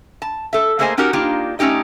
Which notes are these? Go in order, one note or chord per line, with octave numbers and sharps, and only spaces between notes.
A5
A4 E5
A3 A#3 G#4 C5 D#5 G#5
C#4 D#4 F#4 G4 A#4
A#3 D4 D#4 F4 G4
A3 C#4 D#4 G4 D#5